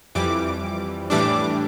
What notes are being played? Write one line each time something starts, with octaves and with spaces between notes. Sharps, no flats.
F2 E3 G3 D6
A2 E3 G3 D4 D6